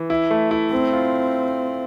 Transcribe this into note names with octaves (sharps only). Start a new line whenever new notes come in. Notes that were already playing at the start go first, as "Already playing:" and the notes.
Already playing: E3
E4
A3
E4
A3 C4
F4